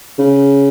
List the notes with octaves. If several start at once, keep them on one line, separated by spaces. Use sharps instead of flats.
C#3